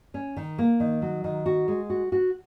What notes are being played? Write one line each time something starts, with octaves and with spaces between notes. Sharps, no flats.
C#4
D#3
A#3
D#3
F#3
D#3
F#4
G#3
F#4
F#4